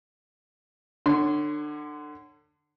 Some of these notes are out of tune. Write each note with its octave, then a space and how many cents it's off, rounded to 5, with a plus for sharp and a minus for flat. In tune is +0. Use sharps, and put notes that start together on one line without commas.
D3 +30 C#5 +0 C6 -25